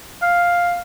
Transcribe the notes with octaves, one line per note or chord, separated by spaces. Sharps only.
F5